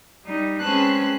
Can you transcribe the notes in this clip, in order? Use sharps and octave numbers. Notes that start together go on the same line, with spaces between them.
G3 D#4
G#3 C4 C#4 B4 A5 F#6